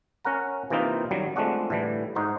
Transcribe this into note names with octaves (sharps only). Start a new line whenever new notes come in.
C#4 A#4 F#5 A#5
C3 E3 A#3 C4 D#4 F4
F#2 D#3 F#3 G3
F3 G#3 A3 C4 D4 F#4
A2 D3 E3 G3
G#2 D#4 F#4 C5